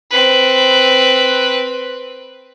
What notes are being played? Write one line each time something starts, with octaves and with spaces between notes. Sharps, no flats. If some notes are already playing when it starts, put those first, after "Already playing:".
C4 B4